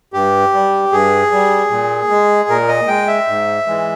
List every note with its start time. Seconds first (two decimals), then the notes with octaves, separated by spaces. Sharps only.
0.13 G2 G4
0.53 G3
0.92 G2 G#4
1.32 G3
1.70 A#2
2.10 G#3
2.49 A#2 A#4
2.69 D#5
2.88 G#3 G5
3.08 E5
3.28 G#2
3.67 E3 G#3